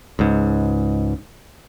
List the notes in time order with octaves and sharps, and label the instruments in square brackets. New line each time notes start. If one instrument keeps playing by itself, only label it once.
[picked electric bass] C#2 G#2